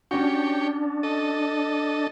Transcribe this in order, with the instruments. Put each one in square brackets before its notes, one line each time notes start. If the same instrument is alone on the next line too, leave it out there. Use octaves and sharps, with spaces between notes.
[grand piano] C#4 F#4 [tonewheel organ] D4 [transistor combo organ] G4 C#5
[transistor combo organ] A4 D#5